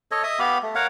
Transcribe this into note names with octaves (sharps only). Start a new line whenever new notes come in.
A4 C#5 D#5
D#5 E5 D#6
B3 G4 F5 B5
A3
A#4 C#5 F5 F#5